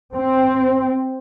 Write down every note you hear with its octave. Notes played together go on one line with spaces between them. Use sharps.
C4